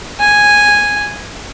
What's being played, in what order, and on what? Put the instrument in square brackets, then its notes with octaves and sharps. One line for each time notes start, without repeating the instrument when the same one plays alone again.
[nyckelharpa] G#5